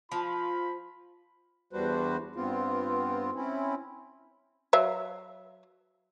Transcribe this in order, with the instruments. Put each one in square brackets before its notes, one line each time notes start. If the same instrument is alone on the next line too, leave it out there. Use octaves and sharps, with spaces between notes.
[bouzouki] F3 [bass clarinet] F4 [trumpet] B5
[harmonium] E2 G3 D4 F#4 B4 C5
G2 B3 C4 F4
C4 C#4 E4
[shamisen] F#3 E5 F5